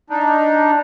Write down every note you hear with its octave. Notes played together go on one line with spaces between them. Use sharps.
D4 D#4